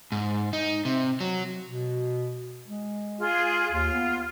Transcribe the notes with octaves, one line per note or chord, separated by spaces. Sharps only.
G#2
D#4
C3
F#3
B2
G#3
F4 G#4
D#2 F4
B3